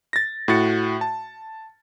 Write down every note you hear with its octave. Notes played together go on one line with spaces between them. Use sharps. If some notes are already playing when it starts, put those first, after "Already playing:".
A6 A#6
A2 F#4 A6 C#7
A5